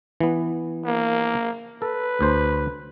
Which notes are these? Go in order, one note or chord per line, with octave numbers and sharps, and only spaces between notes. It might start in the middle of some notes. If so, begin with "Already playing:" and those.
E3 B3
A#3
A4 B4
D2 C5